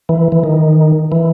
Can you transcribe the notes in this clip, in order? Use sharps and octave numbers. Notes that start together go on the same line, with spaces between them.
E3
E3
D#3
E3